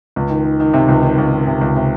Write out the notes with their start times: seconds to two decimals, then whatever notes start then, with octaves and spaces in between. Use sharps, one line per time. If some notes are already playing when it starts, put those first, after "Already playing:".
0.16 C#2
0.30 D#3
0.45 D#3
0.60 D#3
0.74 C3
0.89 C#2
1.03 D#3
1.18 C#2
1.32 D#3
1.47 C3
1.61 C#2
1.76 C3